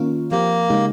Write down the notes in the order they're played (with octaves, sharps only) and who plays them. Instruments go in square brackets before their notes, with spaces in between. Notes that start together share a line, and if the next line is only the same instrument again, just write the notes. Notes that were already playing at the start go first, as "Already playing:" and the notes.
Already playing: [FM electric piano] D#3 A#3 C#4 F4
[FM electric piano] F3 C4 G4 [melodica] A#3
[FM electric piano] C#3 G#3 D#4 G4